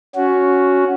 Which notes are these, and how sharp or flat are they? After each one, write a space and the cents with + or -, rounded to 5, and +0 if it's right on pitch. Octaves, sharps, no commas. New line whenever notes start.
C#4 +10 F#4 +0